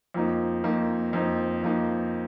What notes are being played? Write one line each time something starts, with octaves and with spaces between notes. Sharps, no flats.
F2 F3 A#3 D#4
F2 F3 A#3 D#4
F2 F3 A#3 D#4
F2 F3 A#3 D#4